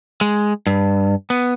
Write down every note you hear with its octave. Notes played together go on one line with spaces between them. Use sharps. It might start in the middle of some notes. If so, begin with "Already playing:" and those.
G#3
G2
B3